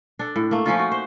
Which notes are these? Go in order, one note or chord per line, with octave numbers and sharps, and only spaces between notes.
D4 A4
A2
A3 A#3
F3 C#4 D#4 F4
F#4
C5